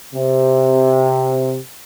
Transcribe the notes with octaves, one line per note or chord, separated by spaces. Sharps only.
C3